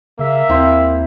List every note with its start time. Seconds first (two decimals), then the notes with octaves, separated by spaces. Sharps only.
0.19 C#3 A#3 E5
0.49 D#2 C4 E4